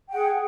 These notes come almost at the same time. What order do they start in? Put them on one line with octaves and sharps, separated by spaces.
G5 F#5 G#4